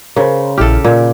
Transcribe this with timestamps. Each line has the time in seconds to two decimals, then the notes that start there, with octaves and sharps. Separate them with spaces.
0.16 C#3 A#4 C5
0.58 A#1 E4 G4 A4 F6
0.84 A#2 A#4